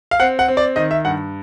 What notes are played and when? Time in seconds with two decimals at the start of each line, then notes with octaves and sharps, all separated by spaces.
0.11 F5
0.20 C4 F#5
0.39 F#5
0.48 C4
0.57 D5
0.76 D#3 D#5
0.91 E5
1.05 G2 F#5